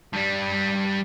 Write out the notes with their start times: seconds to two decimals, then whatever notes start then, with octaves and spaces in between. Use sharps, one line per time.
0.13 G2 G3